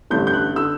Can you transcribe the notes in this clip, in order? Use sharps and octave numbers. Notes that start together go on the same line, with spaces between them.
A1 G2 D3 G6
G6
F#6
D3 E6